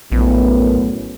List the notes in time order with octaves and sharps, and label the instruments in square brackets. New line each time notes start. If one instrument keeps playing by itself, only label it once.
[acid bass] A#1 [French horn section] F#2 A2 B3